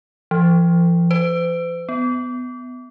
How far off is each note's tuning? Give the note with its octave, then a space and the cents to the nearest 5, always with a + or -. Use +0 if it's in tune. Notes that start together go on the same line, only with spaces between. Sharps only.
F3 -40
C5 -45
B3 +20